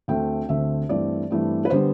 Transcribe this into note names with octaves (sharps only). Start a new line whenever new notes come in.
D2 D3 A3 C4 G5
D2 D3 A3 C4 E5
G2 E3 A3 C4 D5
G2 E3 A3 C4
B4
D3 G3 B3 C5